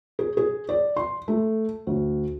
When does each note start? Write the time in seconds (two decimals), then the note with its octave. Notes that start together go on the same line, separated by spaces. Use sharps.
0.19 G#4
0.37 G#4
0.69 D5
0.96 C6
1.28 A3
1.87 D2